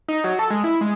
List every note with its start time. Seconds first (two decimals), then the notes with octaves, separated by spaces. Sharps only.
0.08 D#4
0.24 F#3
0.39 A4
0.50 G#3
0.64 E4
0.81 G#3